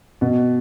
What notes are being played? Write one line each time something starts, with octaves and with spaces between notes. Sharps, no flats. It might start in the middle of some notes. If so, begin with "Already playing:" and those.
B2